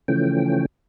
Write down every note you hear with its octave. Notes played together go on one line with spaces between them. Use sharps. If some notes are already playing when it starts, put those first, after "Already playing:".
C#3 E3 F3 A3 C#4 G5